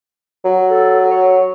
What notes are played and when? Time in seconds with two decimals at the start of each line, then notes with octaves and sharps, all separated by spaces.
0.45 F#3
0.69 A4
1.10 C#5